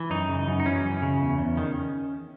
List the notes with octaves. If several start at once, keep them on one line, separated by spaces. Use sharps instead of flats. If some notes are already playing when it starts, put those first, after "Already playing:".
Already playing: E3
F#2 D#4
C#3
F#2
D#4
E3 C#4
F#2
C#3
E2
E2
D#3